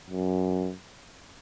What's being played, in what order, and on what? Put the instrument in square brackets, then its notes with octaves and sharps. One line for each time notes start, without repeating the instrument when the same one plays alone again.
[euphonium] F#2